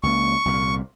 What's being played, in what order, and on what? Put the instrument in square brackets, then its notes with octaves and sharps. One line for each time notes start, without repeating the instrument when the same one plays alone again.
[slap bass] C#2 A#3 [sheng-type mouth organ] C#6
[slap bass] C2 A#2